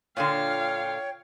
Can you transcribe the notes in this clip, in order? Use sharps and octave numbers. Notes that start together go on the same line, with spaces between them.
A#2 D3 F4 C#5 F5 G5